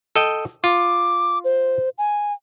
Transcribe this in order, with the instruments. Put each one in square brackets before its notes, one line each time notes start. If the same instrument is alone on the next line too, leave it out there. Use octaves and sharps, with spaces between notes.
[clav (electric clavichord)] A4 D#5 G5
[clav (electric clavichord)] F4 [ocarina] D6
[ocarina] C5
G#5